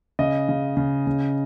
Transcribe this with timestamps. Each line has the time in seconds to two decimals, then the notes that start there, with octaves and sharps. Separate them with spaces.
0.19 C#3 D#5
0.49 C#3
0.77 C#3
1.07 C#3